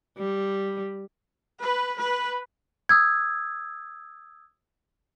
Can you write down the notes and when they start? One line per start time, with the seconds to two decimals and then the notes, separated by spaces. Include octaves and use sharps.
0.18 G3
1.61 B4
1.99 B4
2.89 D#6 E6 G#6